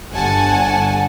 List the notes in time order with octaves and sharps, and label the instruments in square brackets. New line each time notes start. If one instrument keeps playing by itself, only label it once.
[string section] G1 F#5 G#5 A5